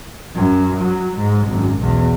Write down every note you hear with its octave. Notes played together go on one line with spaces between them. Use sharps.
F#2
F#3
G#2
G#1 F#2
B1 E2